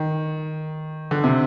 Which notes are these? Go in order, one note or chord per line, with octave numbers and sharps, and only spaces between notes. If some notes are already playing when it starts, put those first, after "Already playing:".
Already playing: D#3
D3
C3